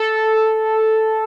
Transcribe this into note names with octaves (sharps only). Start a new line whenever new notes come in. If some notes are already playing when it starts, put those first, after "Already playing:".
Already playing: A4